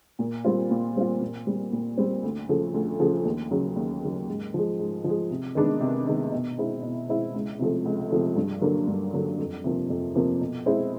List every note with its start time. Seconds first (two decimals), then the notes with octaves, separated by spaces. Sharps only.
0.19 A#2
0.44 G3 C4 F4
0.71 A#2
0.96 G3 C4 F4
1.21 A#2
1.47 G3 C4
1.72 A#2
1.97 G3 C4
2.23 D2
2.49 C#3 F3 A3
2.74 D2
3.00 C#3 F3 A3
3.25 D#2
3.51 C#3 F#3
3.76 D#2
4.03 C#3 F#3
4.28 G#2
4.54 F3 G#3
4.79 G#2
5.04 F3
5.09 G#3
5.31 C3
5.55 D#3 G#3 B3 D4
5.80 C3
6.07 D#3 G#3 B3 D4
6.32 B2
6.58 G#3 C4 E4
6.83 B2
7.08 G#3 C4 E4
7.34 C#2
7.59 C3 F3 A3
7.85 C#2
8.11 C3 F3 A3
8.36 G2
8.62 D3 F#3 A#3 D4
8.87 G2
9.14 D3 F#3 A#3 D4
9.39 F2
9.64 C3 F3 A#3
9.90 F2
10.15 C3 F3 A#3
10.41 B2
10.66 G#3 C4 E4